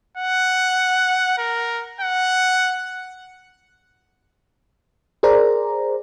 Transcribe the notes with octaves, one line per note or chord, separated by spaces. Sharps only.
F#5
A#4
F#5
G#4 A#4 C5 D5 A#5